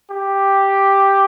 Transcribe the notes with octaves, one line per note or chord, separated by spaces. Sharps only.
G4